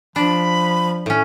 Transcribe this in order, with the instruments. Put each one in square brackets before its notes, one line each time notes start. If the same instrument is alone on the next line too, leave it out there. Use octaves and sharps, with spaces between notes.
[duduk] F3 [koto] D4 [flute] B5
[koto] A2 C#4